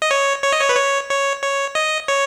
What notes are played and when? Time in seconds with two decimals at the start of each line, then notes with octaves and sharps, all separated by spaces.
0.02 D#5
0.11 C#5
0.44 C#5
0.52 D#5
0.61 C#5
0.69 B4
0.76 C#5
1.10 C#5
1.43 C#5
1.75 D#5
2.08 C#5